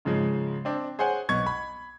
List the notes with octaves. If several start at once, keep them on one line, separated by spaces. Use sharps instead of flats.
G#2 C#3 F3 G#3
C4 D4
G#4 C5 C#5 F#5 G#5
B1 B3 C#6 G#6
B5